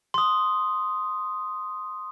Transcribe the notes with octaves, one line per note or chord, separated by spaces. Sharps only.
C6 D#6